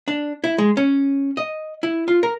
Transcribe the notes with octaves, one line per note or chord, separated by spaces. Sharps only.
D4
E4
G#3
C#4
D#5
E4
F4
A#4